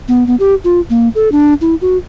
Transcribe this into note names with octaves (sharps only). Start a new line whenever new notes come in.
B3
B3
G4
F4
A#3
A4
D4
E4
F#4